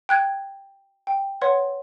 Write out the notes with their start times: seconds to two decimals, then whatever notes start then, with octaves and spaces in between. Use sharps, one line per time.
0.09 G5 F#6 G#6
1.07 G5
1.41 B4 C#5 F#5 C6